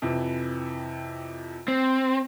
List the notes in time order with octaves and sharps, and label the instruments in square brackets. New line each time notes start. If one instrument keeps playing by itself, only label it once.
[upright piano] F2 C3 E3
[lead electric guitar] C4